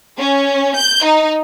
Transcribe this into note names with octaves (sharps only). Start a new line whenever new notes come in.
C#4
G6
D#4